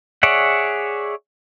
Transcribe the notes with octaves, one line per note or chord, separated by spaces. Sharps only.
G#4 C#5 D5 E5 F#5